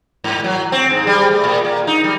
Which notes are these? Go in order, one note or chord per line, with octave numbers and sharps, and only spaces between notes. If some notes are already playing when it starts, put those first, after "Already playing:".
G#2
F#3
C4
G#2
G3
A3
A#2
A#3
D#4
G3